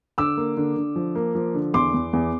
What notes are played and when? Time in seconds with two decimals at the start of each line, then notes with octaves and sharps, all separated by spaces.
0.18 D3 D6 E6
0.37 A#3
0.57 D3
0.76 D3
0.96 F3
1.15 A#3
1.35 F3
1.54 D3
1.74 E2 C6 D6
1.94 E2
2.13 E2